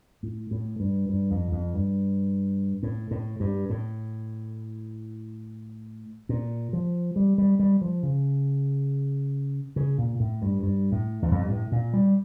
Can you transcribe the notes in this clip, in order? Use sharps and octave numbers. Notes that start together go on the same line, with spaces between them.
A2
A2
G2
G2
F2
F2
G2
A2
A2
G2
A2
A#2
F3
G3
G3
G3
F3
C#3
C#3
A#2
A2
G2
G2
A2
E2
F2
G2
A2
A#2
G3